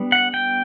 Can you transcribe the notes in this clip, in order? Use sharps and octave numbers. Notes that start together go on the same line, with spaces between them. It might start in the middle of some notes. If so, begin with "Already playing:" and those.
Already playing: G3 B3 D4
F#5
G5